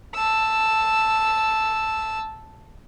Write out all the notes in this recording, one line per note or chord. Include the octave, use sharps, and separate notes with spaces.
A5 E6